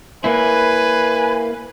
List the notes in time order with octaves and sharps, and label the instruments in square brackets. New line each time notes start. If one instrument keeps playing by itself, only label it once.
[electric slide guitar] A#3 E4 [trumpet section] B4 G#5